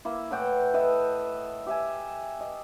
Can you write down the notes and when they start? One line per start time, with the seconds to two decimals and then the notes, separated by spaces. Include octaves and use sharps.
0.05 A#3 E4
0.31 A2 E3 F#5 G5
0.74 A4 B4 D#5 E5
1.66 G4 E5 G#5
2.41 D#5